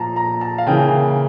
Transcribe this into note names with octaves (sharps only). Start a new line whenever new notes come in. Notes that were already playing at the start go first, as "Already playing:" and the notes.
Already playing: A#2 F3 A5 A#5
A#5
A5
F5
C#3 E3 A#3 G5